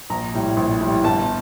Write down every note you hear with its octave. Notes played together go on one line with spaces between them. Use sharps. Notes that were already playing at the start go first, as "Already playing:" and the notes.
A#1 A#5
A2 G3
A#1
A2 G3
G1 A5